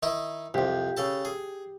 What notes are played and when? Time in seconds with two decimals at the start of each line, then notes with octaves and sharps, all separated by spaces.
0.03 D#3 D#4 E4
0.54 C2 F2 G4
0.97 C#3 A4 A5
1.25 G#4